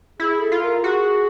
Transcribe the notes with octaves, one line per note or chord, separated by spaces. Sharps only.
E4 G#4
A4
F4
A#4
F#4 G#4